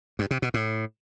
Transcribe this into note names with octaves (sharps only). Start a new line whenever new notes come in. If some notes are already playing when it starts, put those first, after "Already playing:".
G2
C3
B2
A2